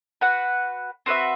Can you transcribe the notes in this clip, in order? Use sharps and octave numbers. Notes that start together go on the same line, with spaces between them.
F#4 B4 F#5
C4 F#4 B4 E5